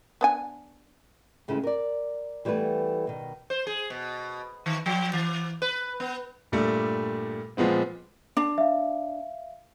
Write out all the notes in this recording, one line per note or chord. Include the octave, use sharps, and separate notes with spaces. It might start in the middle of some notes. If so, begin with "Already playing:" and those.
B3 D4 G#5
G2 C#3 G#3 A3 C4 E4
A#4 D5
E3 G3 A3 B3 B4
B2 D#3
C5
G#4
B2
D#3
F3
E3
B4
B3
G2 A#2 G3 A3
A#2 F3 G#3 B3 C4
D4
E5 F5